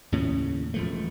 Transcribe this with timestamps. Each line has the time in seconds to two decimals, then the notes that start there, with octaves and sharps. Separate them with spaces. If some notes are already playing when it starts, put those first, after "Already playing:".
0.12 D#2 A2 C#3 C#4
0.74 E1 F3 A3